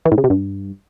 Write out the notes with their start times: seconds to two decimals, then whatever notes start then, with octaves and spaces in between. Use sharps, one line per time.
0.05 E3
0.12 A2
0.18 C#3
0.24 C3
0.30 G2